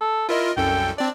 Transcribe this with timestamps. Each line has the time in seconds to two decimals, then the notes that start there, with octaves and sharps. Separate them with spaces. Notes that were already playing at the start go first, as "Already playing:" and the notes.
0.01 A4
0.29 E4 F4 A#4 D#5
0.57 C2 F#2 A4 G5
0.98 C4 D4 D5